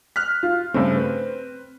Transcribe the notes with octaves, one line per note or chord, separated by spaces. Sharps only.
F6 F#6 B6
F4
G2 C#3 A3 C4
B4